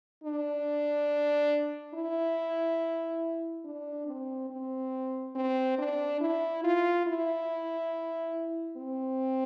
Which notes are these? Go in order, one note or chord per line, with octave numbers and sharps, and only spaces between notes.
D4
E4
D4
C4
C4
C4
D4
E4
F4
E4
C4